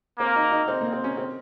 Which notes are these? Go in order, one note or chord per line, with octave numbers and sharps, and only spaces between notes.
A#3 C4
D#4
D#4
C4
A#3
C4
C#4
C4